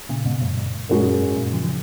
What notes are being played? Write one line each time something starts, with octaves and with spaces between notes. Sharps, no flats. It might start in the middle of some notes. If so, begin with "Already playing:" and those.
A#2 C#3
G#2 B2
F#2 A#2
G#2
F#2 A#2 G#3 C#4 F#4 A#4
F#2
G#2
F#2 A#2
C#3 F3
C#3 F3